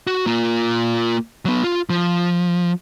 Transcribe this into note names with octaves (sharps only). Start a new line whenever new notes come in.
F#4
A#3 F4
F#3 B3
F4
F3